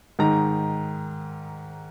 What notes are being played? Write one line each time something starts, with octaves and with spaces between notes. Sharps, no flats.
G#2 D#3 A#5